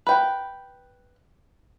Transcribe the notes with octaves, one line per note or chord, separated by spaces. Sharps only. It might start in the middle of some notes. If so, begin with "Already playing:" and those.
B4 G5